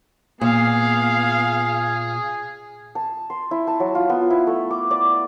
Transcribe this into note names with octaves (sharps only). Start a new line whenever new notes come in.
A#2 B3 G#4 F5
A5
C6
E4
A5
F#3
F4
B3
E4
A3
D6
D5